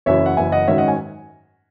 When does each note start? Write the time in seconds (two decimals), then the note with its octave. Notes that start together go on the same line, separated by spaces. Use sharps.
0.06 F#1 F#2 E3 C#5 E5
0.26 F#5
0.37 F#1 F#2 E3 E5 G#5
0.52 D#5 F#5
0.68 G#2 D#3 F#3 C#4 C#5 E5
0.78 D#5 F#5
0.88 G#5